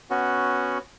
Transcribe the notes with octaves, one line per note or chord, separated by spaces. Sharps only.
B3 C#4 F#4